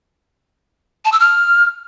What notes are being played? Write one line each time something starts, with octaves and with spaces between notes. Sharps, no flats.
A5
E6
F6